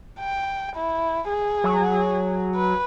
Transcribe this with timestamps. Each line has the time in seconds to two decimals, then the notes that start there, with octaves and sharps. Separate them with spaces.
0.19 G5
0.76 E4
1.29 G#4
1.64 F#3
2.55 B4